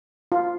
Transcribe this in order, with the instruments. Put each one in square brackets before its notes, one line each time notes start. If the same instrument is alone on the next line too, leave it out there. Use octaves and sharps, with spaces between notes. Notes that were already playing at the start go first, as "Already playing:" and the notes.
[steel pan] F4